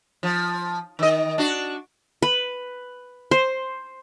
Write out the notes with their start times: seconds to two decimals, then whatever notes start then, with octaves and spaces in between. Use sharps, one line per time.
0.23 F3
0.99 D#3 D#5
1.38 D4 F#4
2.22 B4
3.31 C5